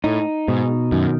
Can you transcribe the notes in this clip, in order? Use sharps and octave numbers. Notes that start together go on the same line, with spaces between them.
A2 D#4
G#2 B2
F#2 D#3